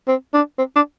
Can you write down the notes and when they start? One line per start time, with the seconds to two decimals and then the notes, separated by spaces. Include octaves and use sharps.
0.08 C4
0.33 D4
0.58 C4
0.76 D4